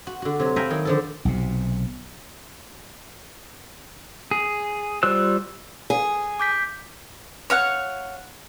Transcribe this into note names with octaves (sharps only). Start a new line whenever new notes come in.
F#4
D3 F#4
C3 F#3
E5 F5 G5 G#5 A#5 B5
D#3 F#3
D3 F3 A4
B1 C3
G#4
G3 F4 C5 E6 F#6
G#4
D6 G6 B6
C#5 F5 F#5